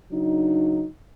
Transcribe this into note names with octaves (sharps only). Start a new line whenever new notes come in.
C#3 F#3 D4 D#4